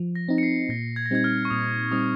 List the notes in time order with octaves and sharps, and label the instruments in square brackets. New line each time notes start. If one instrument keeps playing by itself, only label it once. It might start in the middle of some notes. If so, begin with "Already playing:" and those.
Already playing: [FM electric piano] F3
[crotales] A#6
[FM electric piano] C4 D#4
[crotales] C#7
C7
[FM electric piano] A#2 [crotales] A#6
[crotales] G#6
A#6
[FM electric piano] G3 C4 D#4 [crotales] G#6
[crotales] F6
C#6
[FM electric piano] A#2 [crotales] D#6
[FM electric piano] G3 C4 D#4 [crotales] D#6